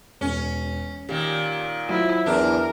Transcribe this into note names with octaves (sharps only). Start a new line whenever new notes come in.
E1 C#4
A#2 D#3 G4
F#3 E4 F4 C5
E2 D4 A#4